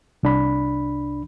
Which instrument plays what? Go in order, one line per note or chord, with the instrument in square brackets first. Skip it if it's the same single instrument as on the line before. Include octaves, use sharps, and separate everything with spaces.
[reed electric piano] C2 D4 B5